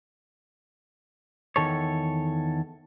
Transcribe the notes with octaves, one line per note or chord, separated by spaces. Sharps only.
E2 D#3 A4 C#5